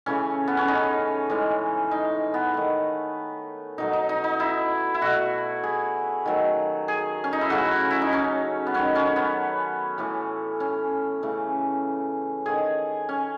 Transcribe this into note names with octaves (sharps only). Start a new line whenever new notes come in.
C#3 E3 A3 C#4
B3
C#4
D#4
A2 E3 G#3
D#4
B3
D#3 A3
B2 F#3 A3 D#4
D#4
D#4
D#4
E4
E4
B2 A3 F#4
G#4
D#3 F#3 A3
G#4
C#4
D#4
E4
C#3 F#3 A3 F#4
E4
D#4
C#4
B3
D#3 F#3 A3 C#4
C#4
B3
A2 E3 A3
C#4
C#3 E3 A3
D#3 A3 G#4
C#4